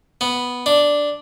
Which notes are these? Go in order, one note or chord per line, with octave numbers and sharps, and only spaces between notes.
B3
D4